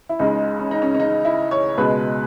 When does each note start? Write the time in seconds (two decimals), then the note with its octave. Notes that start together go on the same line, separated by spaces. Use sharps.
0.09 E4
0.19 C#2 C#3 G#3 D#4
0.60 C#4
0.71 D#4
0.82 C#4
0.95 C#4
1.00 D#4
1.25 E4
1.51 C#5
1.77 C#2 B2 G#3 B4